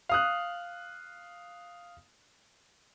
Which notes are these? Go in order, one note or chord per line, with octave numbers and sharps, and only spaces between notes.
F5 D#6 F#6